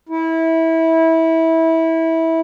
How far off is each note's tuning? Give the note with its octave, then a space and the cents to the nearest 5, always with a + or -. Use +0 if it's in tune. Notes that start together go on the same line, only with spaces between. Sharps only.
E4 -20